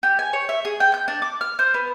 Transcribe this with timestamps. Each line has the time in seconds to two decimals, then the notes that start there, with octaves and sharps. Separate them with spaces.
0.03 G4
0.19 G#5
0.33 C#5
0.49 E5
0.65 G#4
0.80 G5
0.94 G6
1.08 D4
1.22 D6
1.41 F6
1.59 C5
1.74 B3